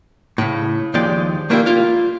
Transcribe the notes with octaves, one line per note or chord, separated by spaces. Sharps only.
A2 C#3
D#2 F3 G#3 D5 G5
A3 A#3 D4 E4 F4 G4
A#3 F4 F5